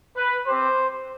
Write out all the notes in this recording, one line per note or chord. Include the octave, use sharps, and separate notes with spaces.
B4
C4 G4 C5